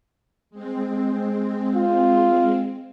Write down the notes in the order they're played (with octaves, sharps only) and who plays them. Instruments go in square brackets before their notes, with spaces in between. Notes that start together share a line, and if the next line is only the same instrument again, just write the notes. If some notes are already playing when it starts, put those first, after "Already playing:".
[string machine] G#3 C4
[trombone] F4